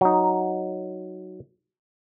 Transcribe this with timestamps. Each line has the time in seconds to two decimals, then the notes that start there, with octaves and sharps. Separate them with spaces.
0.01 F#3 D#4